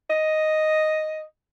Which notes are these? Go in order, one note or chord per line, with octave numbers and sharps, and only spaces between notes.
D#5